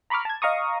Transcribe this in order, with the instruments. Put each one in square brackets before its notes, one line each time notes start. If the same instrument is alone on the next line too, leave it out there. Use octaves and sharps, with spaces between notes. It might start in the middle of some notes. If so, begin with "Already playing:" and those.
[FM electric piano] A#5 B5 C#6 D6 F6
A5 G#6
D#5 F5 A#5 C#6 D#6